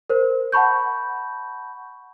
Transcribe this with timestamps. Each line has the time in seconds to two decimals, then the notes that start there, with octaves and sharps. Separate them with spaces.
0.10 A#4 C5
0.52 F#5 A5 B5 C#6 G6